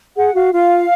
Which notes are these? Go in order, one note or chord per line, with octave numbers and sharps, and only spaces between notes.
G#4 F#5
F#4 F5
F4 F5